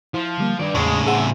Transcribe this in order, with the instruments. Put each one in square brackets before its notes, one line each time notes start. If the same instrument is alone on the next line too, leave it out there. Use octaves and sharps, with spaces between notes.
[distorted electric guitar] F3 [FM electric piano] E4
[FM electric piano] D3 G3 A#3
[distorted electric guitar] G2 D5 [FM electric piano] D#3
[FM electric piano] E2 C#6 [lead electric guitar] A2 C#3 [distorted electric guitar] G#3
[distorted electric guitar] C4 E5 [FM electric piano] G#4 F#5